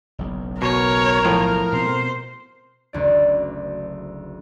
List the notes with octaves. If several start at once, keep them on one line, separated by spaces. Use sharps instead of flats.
F#1 B1
B2 A#4 C#5
A2 F3
B2 C4 C5
F#1 D2 D5